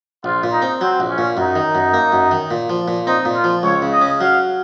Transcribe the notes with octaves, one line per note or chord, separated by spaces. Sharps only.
A#1 F4
A#2
D#4
C4
F#3 C4
A#1
C#4
A#2
F#2 D#4
D#3
F#2
A#3
F#2
D#3
A#2
F3
A#2
C4 D#4
A#2
F4
F3
C#2 C#5
C#3
D#5
C#4
F#3 F5